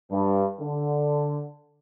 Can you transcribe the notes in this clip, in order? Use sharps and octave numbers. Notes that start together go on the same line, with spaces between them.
G2
D3